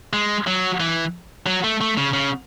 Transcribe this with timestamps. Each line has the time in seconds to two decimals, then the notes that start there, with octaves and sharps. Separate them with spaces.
0.13 G#3
0.47 F#3
0.80 E3
1.47 F#3
1.64 A3
1.81 A3
1.97 C#3
2.13 C#3